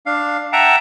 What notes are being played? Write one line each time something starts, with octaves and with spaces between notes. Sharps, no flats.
D4 F5
E5 F#5 G5 A5 A#5